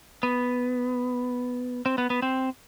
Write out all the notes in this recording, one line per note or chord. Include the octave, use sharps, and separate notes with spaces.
B3
C4
B3
B3
C4